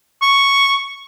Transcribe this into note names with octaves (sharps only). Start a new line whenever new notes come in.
C#6